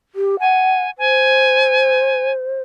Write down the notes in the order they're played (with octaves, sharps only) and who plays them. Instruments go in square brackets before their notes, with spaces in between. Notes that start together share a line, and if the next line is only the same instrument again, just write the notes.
[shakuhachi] G4
[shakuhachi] F#5 [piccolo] G#5
[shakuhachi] C5 [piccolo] G#5